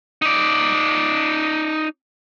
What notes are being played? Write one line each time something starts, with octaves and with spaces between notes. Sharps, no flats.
D#4 D5